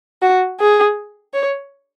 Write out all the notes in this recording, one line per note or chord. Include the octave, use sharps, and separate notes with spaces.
F#4
G#4
C#5